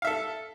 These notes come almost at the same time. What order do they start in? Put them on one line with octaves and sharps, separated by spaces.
F5 E5 A4